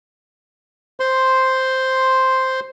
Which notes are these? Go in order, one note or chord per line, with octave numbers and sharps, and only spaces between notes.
C5 C6